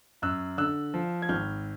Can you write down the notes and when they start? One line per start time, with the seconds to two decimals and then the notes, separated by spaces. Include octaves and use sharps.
0.22 F#2 E6 F#6
0.58 D3 E6 F#6
0.94 F3
1.22 G#6
1.29 G#1 F6 G6